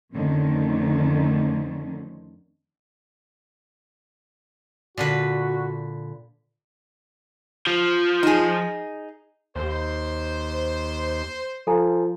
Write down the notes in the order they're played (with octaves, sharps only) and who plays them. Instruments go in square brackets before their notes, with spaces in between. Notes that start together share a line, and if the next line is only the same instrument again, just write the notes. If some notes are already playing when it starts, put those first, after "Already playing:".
[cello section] F2 D3 D#3 A3 C4 C#4
[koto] A#2 D3 B4 [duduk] F#4
[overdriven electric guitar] F3
[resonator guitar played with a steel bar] D#4 G#4
[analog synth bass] D#2 [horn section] C5
[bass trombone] F3 [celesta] A4 G#5 A#5